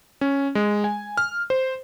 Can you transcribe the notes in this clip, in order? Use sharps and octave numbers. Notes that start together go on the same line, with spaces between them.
C#4
G#3
G#5
F6
C5